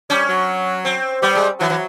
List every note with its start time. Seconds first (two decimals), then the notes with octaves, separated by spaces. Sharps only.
0.10 G3 C#4
0.28 F#3
0.85 C4
1.22 G3 B3
1.35 G#3
1.60 E3 F#3
1.70 E3